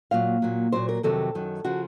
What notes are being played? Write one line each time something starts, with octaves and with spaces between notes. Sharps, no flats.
A#2 F#3 F5
A#2 F#3
A#2 F#3 C5
A#4
F2 C3 D#3 F#3 A4
F#2 D#3 F#3
C#3 F3 F#4